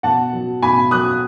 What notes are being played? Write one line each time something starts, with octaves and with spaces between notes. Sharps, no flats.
B2 F#5 A5
F#3
B2 G#5 B5
F#3 D#6 F#6